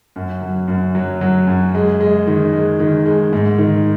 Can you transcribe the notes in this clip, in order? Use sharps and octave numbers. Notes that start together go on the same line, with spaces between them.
F#2
F#3
F#2
F#3
F#3
F#2
G#3
G#3
D#3
G#3
D#3
G#3
G#2
D#3